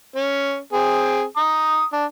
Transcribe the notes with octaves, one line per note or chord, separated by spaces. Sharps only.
C#4
C4 G#4
A#5 D#6
D4